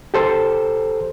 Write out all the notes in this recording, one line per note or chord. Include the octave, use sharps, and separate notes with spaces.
G4 A4 C5